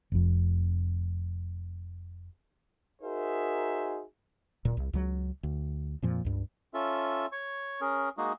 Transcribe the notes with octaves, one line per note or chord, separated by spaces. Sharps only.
F1 F2
D#4 F#4 G#4 A#4 C5 E5
D1 A#2
C2
C#2 F#3
D2
F2 A#2 F3
C#2 G2
C#4 F4 A4 E5
C#5 C#6
C#4 G#4 A#4
G#3 A#3 D#4 F#4 G#4